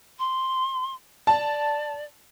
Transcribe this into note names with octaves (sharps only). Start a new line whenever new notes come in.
C6
D5 A5